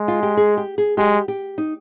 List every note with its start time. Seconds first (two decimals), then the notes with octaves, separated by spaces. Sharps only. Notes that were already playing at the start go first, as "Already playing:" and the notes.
Already playing: G#3
0.08 F4
0.23 G4
0.37 G#4
0.57 G4
0.78 G#4
0.97 G#3 G4
1.28 G4
1.58 D#4